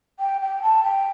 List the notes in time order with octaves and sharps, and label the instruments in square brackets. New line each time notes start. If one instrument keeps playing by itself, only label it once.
[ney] G5
G5
A5
G5